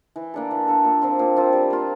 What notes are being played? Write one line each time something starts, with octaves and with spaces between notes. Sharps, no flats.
E3
A#3 D4 A4
E3
A#3 D4 A4
A#2
F3 C4 F4
A#2
F3 C4 F4
G3
A#3 F4